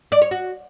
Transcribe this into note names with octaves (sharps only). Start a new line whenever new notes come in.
D5
C#5
F#4